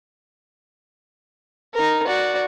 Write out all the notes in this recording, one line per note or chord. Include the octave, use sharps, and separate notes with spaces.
D#4 A#4
F#4 D5